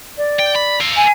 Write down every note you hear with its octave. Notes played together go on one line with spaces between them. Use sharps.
D5
G5
B5
A4 F5
G#5